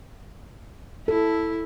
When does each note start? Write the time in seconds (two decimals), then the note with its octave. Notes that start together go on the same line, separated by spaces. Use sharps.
1.08 E4 A4